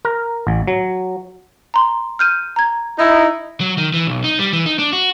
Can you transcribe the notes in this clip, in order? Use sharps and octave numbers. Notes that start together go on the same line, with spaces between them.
A#4
A1
F#3
A#5 C6
F6 G6 D#7
A#5 G#6
D#4 E4
F#3
D#3
E3
B1
D#4
G3
E3
D#4
D4
F#4